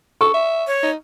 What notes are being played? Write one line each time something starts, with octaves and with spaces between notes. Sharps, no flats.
A4 C#6
E5
C#5
D#4